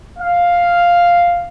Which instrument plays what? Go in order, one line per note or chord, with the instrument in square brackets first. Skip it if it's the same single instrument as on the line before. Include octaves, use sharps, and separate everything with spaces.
[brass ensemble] F5